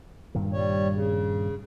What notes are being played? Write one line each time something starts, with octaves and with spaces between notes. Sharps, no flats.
G2 A#2 D#3
G3 C#5
C#3